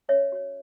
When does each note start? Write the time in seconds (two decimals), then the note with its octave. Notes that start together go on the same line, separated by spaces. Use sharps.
0.09 C#4 C#5 E5
0.32 F#4 C#5